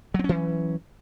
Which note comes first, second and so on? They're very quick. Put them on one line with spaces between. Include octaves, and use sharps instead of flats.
F#3 C4 C#4 E3